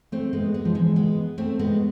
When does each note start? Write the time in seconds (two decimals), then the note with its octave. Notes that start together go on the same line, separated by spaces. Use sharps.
0.12 A3 C4
0.33 G#3 B3
0.54 G#3 B3
0.65 F3
0.75 E3 G#3
0.96 G#3 B3
1.38 A3 C4
1.59 G#3 B3